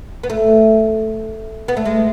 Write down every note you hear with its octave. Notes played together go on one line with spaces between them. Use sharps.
B3
A3
B3
A3
G#3